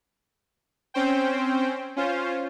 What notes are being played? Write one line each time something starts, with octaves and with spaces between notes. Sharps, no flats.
C4 C#4 C5 G5
C#4 F4 C5